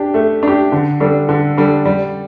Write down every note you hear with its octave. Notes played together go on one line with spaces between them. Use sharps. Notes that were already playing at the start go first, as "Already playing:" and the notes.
Already playing: D4 G4
A3
D4 G4
D3
G3 D4 A4
D3
G3 D4 A4
G3